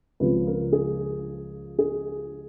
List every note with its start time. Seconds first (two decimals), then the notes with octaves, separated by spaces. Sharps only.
0.20 C#2 C#3 F3 B4
0.47 A#4
0.72 G#4
1.79 G#4